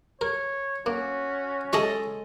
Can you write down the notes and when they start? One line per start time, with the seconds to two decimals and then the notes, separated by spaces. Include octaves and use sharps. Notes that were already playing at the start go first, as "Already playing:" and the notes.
0.21 A#4 C#5
0.86 A#3 C#4 F#4
1.73 G#3 G#4 A4 D#5 E5 C#6